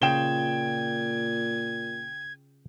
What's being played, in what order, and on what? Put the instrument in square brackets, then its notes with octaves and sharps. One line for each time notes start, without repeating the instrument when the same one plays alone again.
[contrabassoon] A#2 [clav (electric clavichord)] C#3 F4 [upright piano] G5 E7 G7 [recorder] G#6